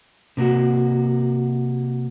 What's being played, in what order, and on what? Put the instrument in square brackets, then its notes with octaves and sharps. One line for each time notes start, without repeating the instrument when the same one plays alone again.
[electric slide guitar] C3 A#3 F#4